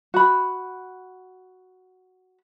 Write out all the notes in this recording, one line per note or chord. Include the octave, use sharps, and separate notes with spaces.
F#4 B5